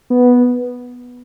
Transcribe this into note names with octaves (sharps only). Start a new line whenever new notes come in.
B3